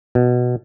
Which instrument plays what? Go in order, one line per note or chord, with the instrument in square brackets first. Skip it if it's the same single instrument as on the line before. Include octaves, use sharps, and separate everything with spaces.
[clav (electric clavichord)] B2